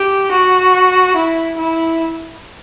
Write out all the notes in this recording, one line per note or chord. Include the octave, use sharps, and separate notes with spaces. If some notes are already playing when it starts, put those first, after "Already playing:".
Already playing: G4
F#4
E4
E4